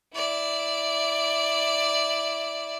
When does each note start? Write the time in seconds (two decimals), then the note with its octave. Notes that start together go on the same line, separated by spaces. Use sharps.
0.14 E4 D5